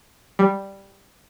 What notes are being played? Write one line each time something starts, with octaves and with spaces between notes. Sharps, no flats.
G3